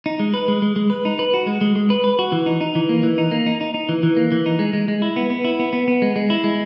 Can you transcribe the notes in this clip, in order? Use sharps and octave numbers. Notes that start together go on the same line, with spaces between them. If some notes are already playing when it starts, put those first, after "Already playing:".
D#4
G#3
B4
G#3
G#3
G#3
B4
D#4
B4
F#4
G#3
G#3
G#3
B4
B4
F#4
E3
D#4
D#4
E3
A#3
E3
D#4
A#3
D#4
D#4
D#4
E3
E3
A#3
E3
D#4
G#3
G#3
G#3
E4
B3
B3
E4
B3
B3
B3
G#3
G#3
E4
G#3